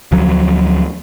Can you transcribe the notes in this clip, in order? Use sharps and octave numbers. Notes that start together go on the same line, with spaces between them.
D2 F3 F#3